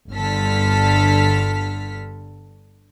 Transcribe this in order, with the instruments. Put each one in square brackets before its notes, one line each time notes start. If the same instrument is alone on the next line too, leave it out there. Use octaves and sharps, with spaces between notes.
[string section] G1 G2 D3 A4 F6 B6